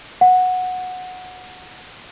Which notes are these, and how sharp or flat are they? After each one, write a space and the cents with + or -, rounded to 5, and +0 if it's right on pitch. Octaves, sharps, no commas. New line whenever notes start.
F#5 -10